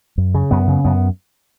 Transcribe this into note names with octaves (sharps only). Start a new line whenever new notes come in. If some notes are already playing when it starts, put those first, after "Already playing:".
F#2
C#3
F#2 B3
C#3
F#2 B3